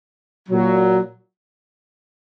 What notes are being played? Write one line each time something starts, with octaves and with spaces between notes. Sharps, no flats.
A#2 F#3